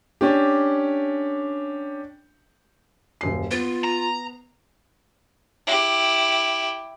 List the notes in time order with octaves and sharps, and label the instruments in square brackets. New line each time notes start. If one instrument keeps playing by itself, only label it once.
[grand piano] C#4 D4 G4
[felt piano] D#1 F#2 C7
[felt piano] B3 [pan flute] F4
[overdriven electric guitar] A#5
[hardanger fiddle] E4 G4